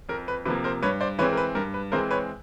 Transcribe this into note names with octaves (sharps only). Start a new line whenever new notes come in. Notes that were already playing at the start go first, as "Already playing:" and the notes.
F2 A#4
B4
C3 F3 A#3 B4
A#4 C5
G2 B4 C#5
C5 D5
E3 G#3 C4 B4 C#5
A#4
B4
G2 A#4
B4
E3 G#3 C4 A#4 C5
B4 C#5